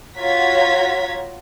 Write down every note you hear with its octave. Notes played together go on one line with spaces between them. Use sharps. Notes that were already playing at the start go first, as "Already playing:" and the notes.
F4 F#4 C#5 A#5 G#6 B6